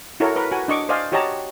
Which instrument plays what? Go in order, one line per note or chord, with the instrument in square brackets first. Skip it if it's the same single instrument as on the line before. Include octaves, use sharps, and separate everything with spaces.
[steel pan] E4 F#4 A4 A#4 C#5
A#4 B4
F#4 G#5
D4 D#5 C#6 D6
C5 D5 D#5 F5 G#5
F#4 G4 C#5 D#5 A5 A#5